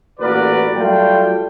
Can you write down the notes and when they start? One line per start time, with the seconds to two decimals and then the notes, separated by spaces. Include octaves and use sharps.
0.20 A1 A#2 F#4 A#4 B4 D5
0.76 F#3 G3 A3 F4 G5